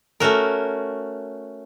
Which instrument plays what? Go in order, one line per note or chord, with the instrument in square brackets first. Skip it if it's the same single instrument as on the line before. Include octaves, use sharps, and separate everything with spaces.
[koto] A3 C#4 F#4 A#4